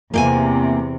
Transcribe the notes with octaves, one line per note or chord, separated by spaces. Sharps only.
E2 C3 A#3 G5 G#5